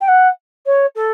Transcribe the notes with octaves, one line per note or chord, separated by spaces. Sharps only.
G5
F#5
C#5
A4